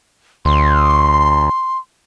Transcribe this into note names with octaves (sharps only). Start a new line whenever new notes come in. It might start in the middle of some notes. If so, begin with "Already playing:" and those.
D2 C6